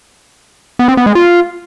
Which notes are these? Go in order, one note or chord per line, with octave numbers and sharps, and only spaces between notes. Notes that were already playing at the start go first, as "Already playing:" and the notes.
B3
C4
B3
G#3
F4